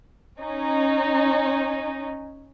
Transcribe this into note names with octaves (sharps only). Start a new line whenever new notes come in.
C#4 D#4